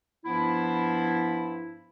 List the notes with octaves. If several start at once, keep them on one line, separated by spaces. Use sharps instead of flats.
G2 F3 B3 E4